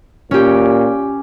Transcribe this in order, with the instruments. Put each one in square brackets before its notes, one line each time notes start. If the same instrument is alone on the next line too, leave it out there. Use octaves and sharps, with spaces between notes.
[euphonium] A#2 [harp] C#4 G4